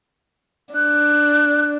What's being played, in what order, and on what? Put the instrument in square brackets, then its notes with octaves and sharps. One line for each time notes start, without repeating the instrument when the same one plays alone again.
[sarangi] D4 [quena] F#6